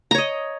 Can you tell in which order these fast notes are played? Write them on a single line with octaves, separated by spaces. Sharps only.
A#5 C#5 D#5